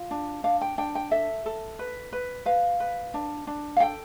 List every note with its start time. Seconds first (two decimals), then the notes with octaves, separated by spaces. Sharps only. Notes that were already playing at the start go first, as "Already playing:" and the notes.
Already playing: F4
0.11 D4
0.44 D4 F5
0.61 G5
0.78 D4 G5
0.95 G5
1.11 A4 E5
1.46 A4
1.79 B4
2.12 B4
2.46 B4 F5
2.80 B4
3.14 D4
3.47 D4
3.76 F5
3.80 A4 G5